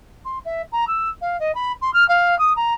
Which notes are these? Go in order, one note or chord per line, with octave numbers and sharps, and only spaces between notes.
C6
E5
A#5
E6
F5
D#5
B5
C6
F6
F5
D#6
A#5